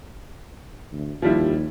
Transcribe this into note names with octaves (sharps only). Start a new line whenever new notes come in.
D2
D#2 F3 G3 E4